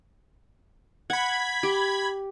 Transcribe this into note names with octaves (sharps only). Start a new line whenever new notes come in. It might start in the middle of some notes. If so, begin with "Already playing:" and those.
F#5 B5 G#6
G4